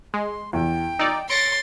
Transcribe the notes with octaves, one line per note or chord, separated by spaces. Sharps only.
G#3 C6
E2 G5
D#4 D5 E6
C#5 C6 A6 A#6 C#7 D7